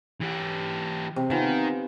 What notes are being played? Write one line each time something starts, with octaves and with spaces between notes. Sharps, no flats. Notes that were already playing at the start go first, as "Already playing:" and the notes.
E3 G4
C3
D#3 B3 F4 G#5